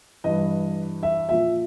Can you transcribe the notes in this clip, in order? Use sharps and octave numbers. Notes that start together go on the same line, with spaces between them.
G2 E3 D#5
E5
A#2 F3 E5